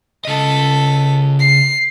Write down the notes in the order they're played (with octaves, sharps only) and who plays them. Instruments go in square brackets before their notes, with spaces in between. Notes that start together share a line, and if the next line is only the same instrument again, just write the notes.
[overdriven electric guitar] C#3 D#5 [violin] A4 B6
[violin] C7